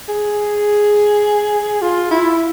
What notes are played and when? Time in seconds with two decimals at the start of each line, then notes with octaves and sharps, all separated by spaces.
0.09 G#4
1.82 F4
2.11 E4